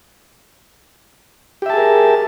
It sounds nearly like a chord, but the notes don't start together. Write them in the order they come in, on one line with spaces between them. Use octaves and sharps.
G4 E5 A5 G#4 A#4